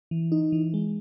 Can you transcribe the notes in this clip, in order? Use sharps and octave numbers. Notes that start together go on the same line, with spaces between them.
E3
D#4
E3
G#3